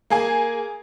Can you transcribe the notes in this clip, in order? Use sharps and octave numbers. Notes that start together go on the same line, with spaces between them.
A#3 G#4 G#5